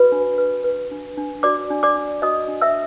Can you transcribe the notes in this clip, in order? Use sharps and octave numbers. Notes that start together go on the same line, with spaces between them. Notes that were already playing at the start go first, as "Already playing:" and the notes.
Already playing: F#4 B4 B5
D4
B4
B4
D4
D4
F#4 D5 D6
D4
D5 D6
D4
F#4 D#5 D#6
D4
E5 E6